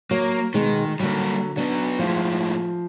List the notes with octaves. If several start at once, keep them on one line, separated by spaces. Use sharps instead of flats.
F#3 A#3
B2 D#3 G#3
D3 F#3 G3 A#3
F#3 B3 D4
A2 F3 G#3